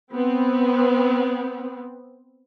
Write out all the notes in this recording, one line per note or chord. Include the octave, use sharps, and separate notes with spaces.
B3 C4